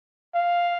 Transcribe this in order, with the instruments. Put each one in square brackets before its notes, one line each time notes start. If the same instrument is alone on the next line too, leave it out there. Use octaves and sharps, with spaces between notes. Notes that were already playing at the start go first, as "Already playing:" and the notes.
[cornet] F5